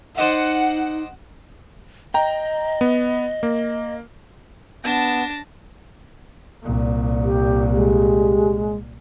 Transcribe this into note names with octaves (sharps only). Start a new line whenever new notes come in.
D#4 C5 D5 D#5 F#5
D#5 G5 A#5
B3
A#3
B3 D4 A5 A#6
C2 A#2
G4
G#3 G4